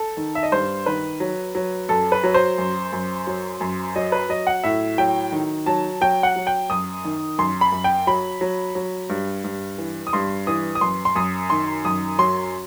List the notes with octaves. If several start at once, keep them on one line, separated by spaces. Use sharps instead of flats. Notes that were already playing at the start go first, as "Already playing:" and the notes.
Already playing: A4
D#3
E5
D#5
G2 C5
D#3 B4
F#3
F#3
F#2 A4
B4
F#3
C5
F#2
F#2
F#3
F#2
F#3 D#5
B4
F#3 D#5
F#5
A2 E5
F#3 G5
D#3
F#3 A5
F#3 G5
F#5
F#3
G5
F#2 D#6
D#3
F#2 C6
B5
F#2
G5
F#3 B5
F#3
F#3
G2
G2
E3
D#6
G2 C6
E3 D#6
D#6
F#2 C6
C6
F#2 D#6
D#3 C6
F#2 D#6
F#3 C6